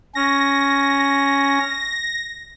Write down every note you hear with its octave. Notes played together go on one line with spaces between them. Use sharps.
C#4 A#6